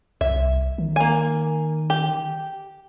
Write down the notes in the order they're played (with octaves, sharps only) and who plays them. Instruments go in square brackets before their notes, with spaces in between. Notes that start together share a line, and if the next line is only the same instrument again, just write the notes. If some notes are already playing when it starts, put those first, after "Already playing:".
[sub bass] C2 [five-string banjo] E5
[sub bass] D#3
[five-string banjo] A#3 G#5
G4